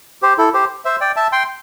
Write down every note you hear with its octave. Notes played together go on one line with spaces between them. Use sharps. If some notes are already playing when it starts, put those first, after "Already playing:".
G4 C5
E4 A4
G4 C5
C5 E5
D5 G5
E5 A5
G5 C6